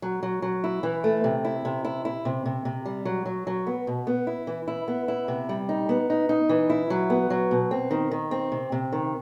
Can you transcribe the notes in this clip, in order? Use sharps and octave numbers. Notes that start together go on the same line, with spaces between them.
F#3
F#3
F#3
E4
E3
A3
C3
E4
C3
E4
E4
C3
C3
C3
G3
F#3
F#3
F#3
B3
B2
B3
E4
E3
E4
B3
E4
C3
G3
D#4
B3
D#4
D#4
E3
E4
F#3
B3
F#3
B2
C4
D#3
D#3
C4
C3
C3
D#3